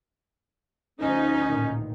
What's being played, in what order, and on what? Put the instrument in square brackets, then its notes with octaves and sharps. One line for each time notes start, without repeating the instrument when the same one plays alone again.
[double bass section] D2 F3 [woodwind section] C#4 [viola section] D#4
[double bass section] A1 A#2 D#3